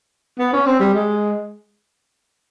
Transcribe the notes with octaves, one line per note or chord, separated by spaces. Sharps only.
B3
C#4
C4
G3
G#3